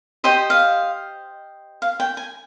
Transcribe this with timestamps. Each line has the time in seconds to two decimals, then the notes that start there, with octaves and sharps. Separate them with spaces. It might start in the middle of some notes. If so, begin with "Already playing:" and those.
0.24 G4 C5 D#5 G5
0.50 F5
1.82 F5
2.00 G5
2.17 G#5